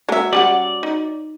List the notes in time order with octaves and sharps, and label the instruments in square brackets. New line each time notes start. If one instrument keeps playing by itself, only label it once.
[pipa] F#3 E5 [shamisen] G#3 A#3
[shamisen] G3 C#4 F#5 [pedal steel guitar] D5
[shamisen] D#4